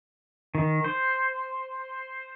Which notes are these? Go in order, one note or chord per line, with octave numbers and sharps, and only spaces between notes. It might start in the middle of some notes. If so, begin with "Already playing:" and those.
D#3
C5